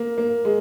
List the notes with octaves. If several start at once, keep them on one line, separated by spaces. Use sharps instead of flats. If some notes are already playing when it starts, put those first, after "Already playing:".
Already playing: A#3
A#3
G#3